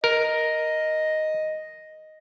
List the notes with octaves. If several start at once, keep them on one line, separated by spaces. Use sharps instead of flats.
A#4 D#5